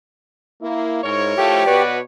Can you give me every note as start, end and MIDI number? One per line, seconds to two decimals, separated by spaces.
0.62 1.03 58
0.62 1.03 64
1.04 1.37 44
1.04 1.63 64
1.04 1.63 70
1.04 1.63 73
1.37 1.64 53
1.37 1.64 57
1.37 1.83 67
1.67 1.99 47
1.67 2.00 66
1.67 1.99 71
1.67 2.00 73
1.67 2.00 74